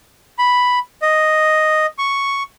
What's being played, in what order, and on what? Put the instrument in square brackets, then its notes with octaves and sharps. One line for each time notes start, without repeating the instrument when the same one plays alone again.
[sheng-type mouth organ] B5
D#5
C#6